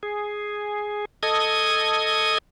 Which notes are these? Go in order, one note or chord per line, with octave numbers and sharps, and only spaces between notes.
G#4
A4 D#5 D#6 G#6